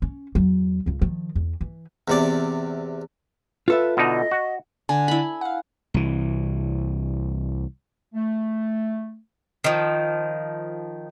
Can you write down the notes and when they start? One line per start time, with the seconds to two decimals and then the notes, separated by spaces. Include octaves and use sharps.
0.02 C#4
0.35 E2 F#3
0.86 C#2 C#3
1.01 D#3 F3
1.35 E2
1.61 E3
2.08 E2 C3 D5
3.68 F4 A4 B4 E5
3.97 B2 D3 D#4 D#5
4.31 F#4
4.89 D3 G#5
5.08 E4 B5
5.41 F5 F#5
5.94 C2 E3
8.14 A3
9.64 D#3 F3